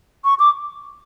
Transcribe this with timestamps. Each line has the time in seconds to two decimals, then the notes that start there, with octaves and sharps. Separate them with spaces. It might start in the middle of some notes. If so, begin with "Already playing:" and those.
0.25 C#6
0.39 D6